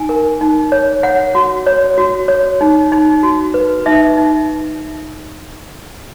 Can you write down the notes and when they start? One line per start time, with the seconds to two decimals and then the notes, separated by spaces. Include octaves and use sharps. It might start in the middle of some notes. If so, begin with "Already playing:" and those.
Already playing: D#4 G#5
0.09 A#4
0.41 D#4
0.72 C#5
1.03 C#5 F#5
1.35 F#4
1.67 C#5
1.98 F#4
2.28 C#5
2.61 D#4
2.92 D#4
3.23 F#4
3.54 B4
3.86 D#4 E5
4.17 D#4